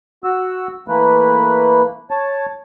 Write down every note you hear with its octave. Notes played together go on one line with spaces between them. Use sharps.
F#4 E6
E3 A3 A#3 B4
C#5 A5